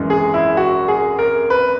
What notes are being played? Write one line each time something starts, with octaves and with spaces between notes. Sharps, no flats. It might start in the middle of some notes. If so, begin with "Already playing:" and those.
Already playing: G#1 F#2 E3 G#3
G#4
E4
F#4
G#4
A#4
B4